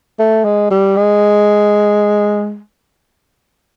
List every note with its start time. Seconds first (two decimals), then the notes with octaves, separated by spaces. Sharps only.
0.19 A3
0.45 G#3
0.71 G3
0.97 G#3